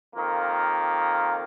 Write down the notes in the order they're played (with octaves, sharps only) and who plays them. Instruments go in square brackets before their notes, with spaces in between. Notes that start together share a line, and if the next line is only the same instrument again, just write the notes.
[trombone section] F2 D#3 A#3 F4